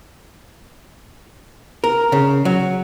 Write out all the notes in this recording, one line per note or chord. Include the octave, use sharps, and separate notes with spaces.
A#4
C#3
F#3